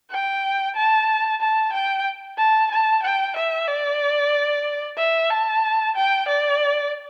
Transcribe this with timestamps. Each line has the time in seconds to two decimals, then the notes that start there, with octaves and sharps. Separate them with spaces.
0.10 G5
0.75 A5
1.41 A5
1.73 G5
2.38 A5
2.71 A5
3.02 G5
3.36 E5
3.67 D5
4.98 E5
5.30 A5
5.95 G5
6.28 D5